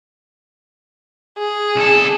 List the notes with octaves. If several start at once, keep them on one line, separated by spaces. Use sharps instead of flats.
G#4
C2 A4